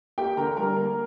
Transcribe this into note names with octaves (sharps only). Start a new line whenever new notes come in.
A#3 G4 G5
D3 A#4 A#5
G3 A#4 A#5
A#3